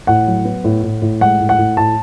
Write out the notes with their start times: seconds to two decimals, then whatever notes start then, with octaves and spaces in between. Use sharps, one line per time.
0.07 A2 F#5
0.27 F#3
0.45 B3
0.64 A2
0.83 A2
1.02 A2
1.21 G#3 F#5
1.40 A2
1.49 F#5
1.58 A2
1.77 A2 A5